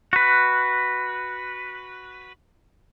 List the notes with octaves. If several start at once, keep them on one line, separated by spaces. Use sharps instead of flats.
F#4 B4